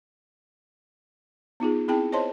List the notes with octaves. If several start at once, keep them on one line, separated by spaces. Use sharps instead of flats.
B3 D#4 F4 G#4
C4 E4 G#4 G5 A5
C5 C#5 D#5 A5 C6